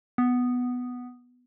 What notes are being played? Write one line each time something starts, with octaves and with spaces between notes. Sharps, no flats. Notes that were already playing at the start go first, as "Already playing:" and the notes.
B3